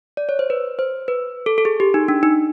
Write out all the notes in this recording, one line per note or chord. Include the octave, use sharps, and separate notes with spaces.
D5
C#5
C5
B4
C5
B4
A4
A4
G#4
G4
D#4
D4
D#4